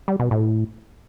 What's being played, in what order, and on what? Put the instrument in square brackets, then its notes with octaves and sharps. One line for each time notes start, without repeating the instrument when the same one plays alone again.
[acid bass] G3
B2
A2